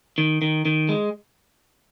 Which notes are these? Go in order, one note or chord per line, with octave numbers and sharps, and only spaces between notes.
D#3
D#3
D#3
G#3